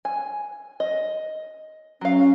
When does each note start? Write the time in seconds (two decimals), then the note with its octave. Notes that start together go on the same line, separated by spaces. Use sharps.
0.05 G#5
0.80 D#5
2.01 F#3 C#4 F5